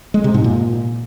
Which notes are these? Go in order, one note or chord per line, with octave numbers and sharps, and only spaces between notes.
G#3
C3
G#2
A#2